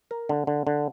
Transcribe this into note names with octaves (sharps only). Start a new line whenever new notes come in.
A#4
D3
D3
D3